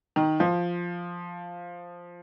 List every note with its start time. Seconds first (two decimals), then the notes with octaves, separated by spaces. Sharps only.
0.16 D#3
0.40 F3